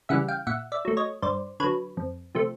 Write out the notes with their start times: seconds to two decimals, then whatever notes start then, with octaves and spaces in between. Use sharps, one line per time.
0.09 C#3 E3 G3 E5 F#5
0.28 F5 G5
0.47 A#2 E5 F#5
0.72 D5 E5
0.85 F#3 A3
0.97 C#5 D#5
1.22 G2 C5 D5
1.60 D3 F#3 B4 C#5
1.97 F2
2.35 C3 F3 A3